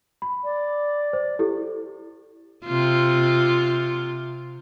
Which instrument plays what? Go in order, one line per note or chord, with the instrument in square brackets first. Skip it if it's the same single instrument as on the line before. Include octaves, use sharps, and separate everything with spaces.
[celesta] B5
[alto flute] D5
[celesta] C5
E4 G4 A4
[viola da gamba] C3 F4